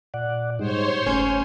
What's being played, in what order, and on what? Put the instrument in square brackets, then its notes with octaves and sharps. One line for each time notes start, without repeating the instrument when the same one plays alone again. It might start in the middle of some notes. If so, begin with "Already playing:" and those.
[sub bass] A#2 [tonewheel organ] D5 F#5
[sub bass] G#2 [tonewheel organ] G3 G#3 D#4 [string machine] C5 C#5 C6
[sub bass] F#1 [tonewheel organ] A3 [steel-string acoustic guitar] C#4